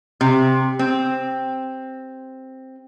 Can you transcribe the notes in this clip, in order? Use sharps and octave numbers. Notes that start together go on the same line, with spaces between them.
C3
C4